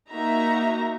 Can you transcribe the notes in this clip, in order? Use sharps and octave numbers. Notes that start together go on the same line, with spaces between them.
A#3 D#4 F#4 E5 A#5